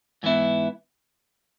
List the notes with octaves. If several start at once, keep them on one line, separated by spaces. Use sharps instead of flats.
G#2 E3 B3 E4